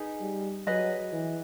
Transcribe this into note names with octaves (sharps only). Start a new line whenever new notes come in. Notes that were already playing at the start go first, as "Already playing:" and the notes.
Already playing: D#4 G#4 B4
G3
F#3 G#4 B4 D#5
E3